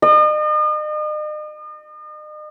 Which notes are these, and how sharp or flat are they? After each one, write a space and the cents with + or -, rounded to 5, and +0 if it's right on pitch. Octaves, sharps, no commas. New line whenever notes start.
D#5 -40